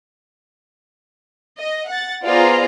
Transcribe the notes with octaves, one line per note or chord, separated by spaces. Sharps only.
D#5
F#5 A6
B3 F4 G#4 C5 D5 A#5